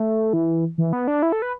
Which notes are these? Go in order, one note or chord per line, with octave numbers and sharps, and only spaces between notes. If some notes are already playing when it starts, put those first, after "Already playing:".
Already playing: A3
E3
E3
B3
D4
E4
A4
B4